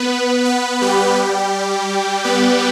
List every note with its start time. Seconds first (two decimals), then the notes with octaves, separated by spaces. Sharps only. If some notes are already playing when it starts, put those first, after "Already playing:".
Already playing: B3 B4
0.45 B3 B4
0.81 G3 G4
2.24 B3 B4